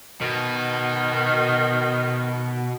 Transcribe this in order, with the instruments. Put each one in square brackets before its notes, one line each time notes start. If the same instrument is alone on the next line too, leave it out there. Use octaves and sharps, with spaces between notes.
[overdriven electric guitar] B2 B3 [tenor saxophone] D#3